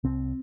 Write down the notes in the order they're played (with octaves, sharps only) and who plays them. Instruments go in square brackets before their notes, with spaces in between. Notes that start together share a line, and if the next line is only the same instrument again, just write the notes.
[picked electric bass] C2 C4